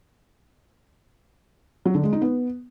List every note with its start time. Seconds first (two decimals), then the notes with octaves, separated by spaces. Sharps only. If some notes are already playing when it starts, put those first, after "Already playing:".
1.85 F#3
1.94 D3
2.03 G#3
2.13 D#4
2.22 B3